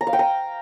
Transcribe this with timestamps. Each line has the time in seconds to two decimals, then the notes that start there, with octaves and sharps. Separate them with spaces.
0.01 A#5
0.07 F5
0.13 G5
0.19 A#5